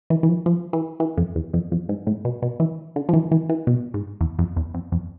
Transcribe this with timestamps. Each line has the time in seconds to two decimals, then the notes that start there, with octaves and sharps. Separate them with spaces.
0.10 E3
0.23 E3
0.29 F3
0.46 F3
0.73 E3
1.00 E3
1.17 F2
1.35 E2
1.53 F2
1.72 F2
1.89 G#2
2.07 A2
2.25 B2
2.42 B2
2.60 E3
2.96 D3
3.09 F3
3.13 E3
3.32 E3
3.49 E3
3.67 B2
3.94 G#2
4.21 E2
4.39 F2
4.56 E2
4.74 F2
4.92 F2